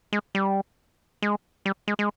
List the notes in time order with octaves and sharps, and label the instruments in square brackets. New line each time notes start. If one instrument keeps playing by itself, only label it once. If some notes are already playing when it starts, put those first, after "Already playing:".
[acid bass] G#3
G3
G#3
G3
G#3
G#3